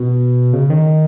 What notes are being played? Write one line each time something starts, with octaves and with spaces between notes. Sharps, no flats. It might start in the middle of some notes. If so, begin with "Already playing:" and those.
Already playing: B2
C#3
D#3